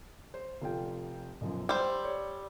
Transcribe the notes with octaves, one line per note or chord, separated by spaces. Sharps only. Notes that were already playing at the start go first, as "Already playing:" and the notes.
C5
F1 F4 G5
B1 F#2 F3
G3 C5 E6
C#5 D5